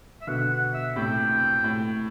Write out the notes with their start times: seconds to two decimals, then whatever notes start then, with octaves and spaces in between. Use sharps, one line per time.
0.22 E5
0.27 B2 D3 F#5
0.51 F#5
0.74 E5
0.96 A2 C3 G5
1.64 A2